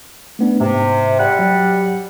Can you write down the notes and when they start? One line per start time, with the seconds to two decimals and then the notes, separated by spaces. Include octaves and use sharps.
0.39 A3 B3 D4
0.60 G#2 C3
1.19 G3 F#5
1.39 F#3